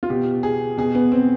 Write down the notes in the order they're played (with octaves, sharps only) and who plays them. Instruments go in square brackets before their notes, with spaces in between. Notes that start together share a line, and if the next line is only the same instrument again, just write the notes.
[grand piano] F4
B2 G4
G#4
B2 G#4
B3
C4